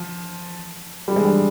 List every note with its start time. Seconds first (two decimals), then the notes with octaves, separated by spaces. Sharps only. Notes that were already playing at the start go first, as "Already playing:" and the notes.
Already playing: F3
1.08 G3
1.16 G#3
1.25 G3